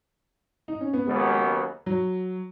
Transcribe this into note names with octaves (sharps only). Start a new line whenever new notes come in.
D#4
C#4
B3
D#2 C#3 F#3 G#3 B3
F#3